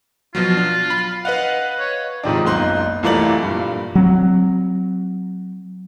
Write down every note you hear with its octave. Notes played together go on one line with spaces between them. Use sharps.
B2 F3 F#3 F4
D4
B5
B4 D#5 F5 F#5
C#5
G#2 C3 D#3 F3 D4
F#1 B1 A#3 D#4 C6 F#6
C2 E3 A3 A#3 D5 F#7
G2 A#2
F#3 C4